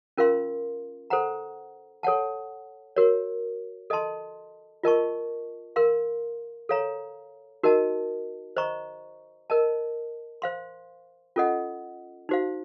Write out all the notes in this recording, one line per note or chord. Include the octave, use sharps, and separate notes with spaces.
C#4 F4 A#4 F5 C6
A4 C5 F#5 A#5
A4 C#5 F#5 A5
F#4 A#4 C#5
A4 D#5 A5 C6
F4 A#4 D#5 A5 C#6
A#4 F5 C6
A4 C#5 F5 A#5
D#4 F#4 A#4 D#5 A5
C5 D#5 A#5 C#6
A#4 D#5 A5
C5 F5 C6
C#4 F4 A4 D#5 F#5
D#4 F#4 C5 F5